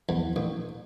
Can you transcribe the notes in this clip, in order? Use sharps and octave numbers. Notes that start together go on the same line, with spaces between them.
E2
A1